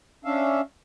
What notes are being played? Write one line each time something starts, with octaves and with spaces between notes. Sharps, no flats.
C#4 D4 E5 F5